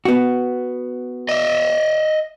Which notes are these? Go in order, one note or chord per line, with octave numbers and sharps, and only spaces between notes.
B3 F#4
D#5 E5